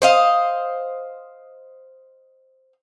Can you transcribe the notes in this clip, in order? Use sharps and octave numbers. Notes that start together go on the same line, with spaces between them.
C5 D#5 F5